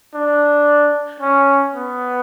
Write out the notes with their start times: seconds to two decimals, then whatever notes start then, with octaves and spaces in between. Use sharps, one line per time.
0.14 D4
1.20 C#4
1.74 B3